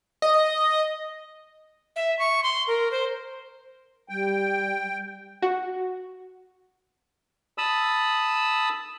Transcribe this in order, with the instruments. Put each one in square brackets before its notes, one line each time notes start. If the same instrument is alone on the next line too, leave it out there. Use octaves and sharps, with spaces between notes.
[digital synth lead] D#5
[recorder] E5
C#6
C6
A#4
C5
[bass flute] G3 [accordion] G5
[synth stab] F#4
[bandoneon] A5 B5 D#6 E6